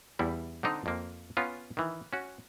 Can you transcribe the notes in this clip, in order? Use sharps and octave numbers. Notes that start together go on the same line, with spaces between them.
E2 G3 E4
D3 C4 D4 D#4
F2 A#3 C4
B3 C#4 F4
D#3 E3
C#4 F#4